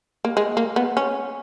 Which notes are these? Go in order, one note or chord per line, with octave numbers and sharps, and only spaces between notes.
A#3
G#3
A#3
B3
C#4